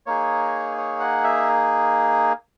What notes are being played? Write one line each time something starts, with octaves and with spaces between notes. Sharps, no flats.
A#3 D#4 G#4 C#5
C#5
F#5
E5